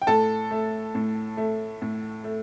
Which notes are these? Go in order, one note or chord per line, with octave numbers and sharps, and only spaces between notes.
G5
A2 A4 A5
A3
A2
A3
A2
A3